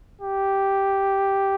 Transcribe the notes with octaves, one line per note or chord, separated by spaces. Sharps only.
G4